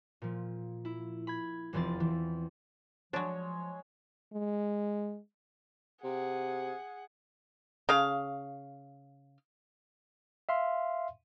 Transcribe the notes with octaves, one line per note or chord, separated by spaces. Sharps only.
A#2 F3
E4
B5 G#6
F1 E2 E3 F3 C4 A6
E3
F3 F#3 G#3 D4 C#5
G#3
C3 G#4 F#5
C#3 F5
E5 F5 C6